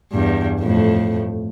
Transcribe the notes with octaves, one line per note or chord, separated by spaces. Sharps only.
E2 G2
F2 A2 A3